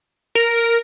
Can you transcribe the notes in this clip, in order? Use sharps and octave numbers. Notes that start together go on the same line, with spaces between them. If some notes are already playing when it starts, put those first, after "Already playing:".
A#4